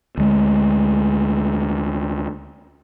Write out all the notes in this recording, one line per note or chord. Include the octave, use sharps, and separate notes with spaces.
D2 G#3